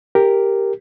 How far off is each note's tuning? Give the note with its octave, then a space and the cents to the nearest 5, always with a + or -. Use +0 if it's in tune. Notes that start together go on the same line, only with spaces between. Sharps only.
G4 +5 A#4 -5